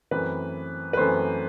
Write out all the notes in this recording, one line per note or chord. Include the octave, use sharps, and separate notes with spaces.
F#2 E3 A3 C4 B4
B4
F#2 E3 A3 C4 C5